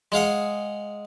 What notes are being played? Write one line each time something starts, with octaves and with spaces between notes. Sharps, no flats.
G#3 G#4 F5 F#5